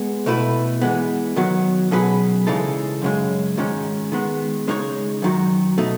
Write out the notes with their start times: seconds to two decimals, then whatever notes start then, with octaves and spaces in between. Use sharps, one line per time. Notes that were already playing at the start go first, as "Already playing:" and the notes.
Already playing: G#3 B3
0.26 B2 A3 E4 B4
0.81 E3 G#3 B3
1.36 D#3 F#3 B3
1.91 B2 F#3 C#4 G#4 B4
2.47 C#3 E3 G#3 D#4 A4
3.02 F#2 C#3 G#3
3.57 G#2 D#3 G#3 C#4
4.12 D#3 G#3 B3
4.67 C#3 G#3 D#4 A4 C#5
5.22 F#2 D#3 F#3
5.78 B2 A3 D#4